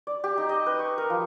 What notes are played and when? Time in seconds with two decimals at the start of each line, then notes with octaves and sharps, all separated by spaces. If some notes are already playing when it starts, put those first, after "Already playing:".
0.07 D5
0.24 G4
0.38 D#4
0.49 D#5
0.66 B4
0.79 C#6
0.98 A#4
1.10 F3